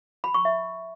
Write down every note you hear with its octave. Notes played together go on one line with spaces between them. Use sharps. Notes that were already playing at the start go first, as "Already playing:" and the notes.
B5
C#6
E5